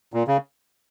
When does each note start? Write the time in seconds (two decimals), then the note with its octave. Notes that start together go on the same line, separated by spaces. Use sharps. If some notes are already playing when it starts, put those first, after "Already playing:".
0.14 A#2
0.28 C#3